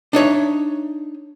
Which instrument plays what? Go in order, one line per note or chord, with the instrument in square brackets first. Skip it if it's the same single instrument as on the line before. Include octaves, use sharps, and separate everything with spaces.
[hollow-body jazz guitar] D4 D#4 C#5 E5